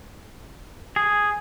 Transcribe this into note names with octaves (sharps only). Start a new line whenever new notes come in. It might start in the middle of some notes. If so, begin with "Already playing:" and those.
G#4